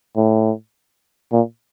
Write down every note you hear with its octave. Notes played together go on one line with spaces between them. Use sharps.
A2
A#2